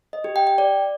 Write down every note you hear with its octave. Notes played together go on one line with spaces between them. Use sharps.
D#5
G4
G5
G5
D5